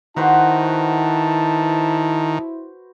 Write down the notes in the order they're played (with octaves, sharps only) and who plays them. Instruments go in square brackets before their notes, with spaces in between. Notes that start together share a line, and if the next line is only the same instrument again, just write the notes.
[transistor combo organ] D#3 [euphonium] E4 [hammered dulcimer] F#4 B4 C5 [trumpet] A5